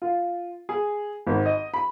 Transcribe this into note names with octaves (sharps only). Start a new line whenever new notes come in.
F4
G#4
G#1
D#5
B5